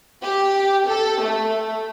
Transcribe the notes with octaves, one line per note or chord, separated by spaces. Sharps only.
G4
A4
A3